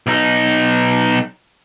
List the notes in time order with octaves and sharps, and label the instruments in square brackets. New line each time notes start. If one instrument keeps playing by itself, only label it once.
[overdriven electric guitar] B1 D#4